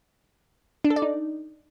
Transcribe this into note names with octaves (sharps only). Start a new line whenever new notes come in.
D4
A4
D5
D#4